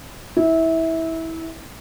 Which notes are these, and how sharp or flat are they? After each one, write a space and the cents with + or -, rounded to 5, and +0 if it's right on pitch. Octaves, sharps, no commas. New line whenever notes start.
E4 -20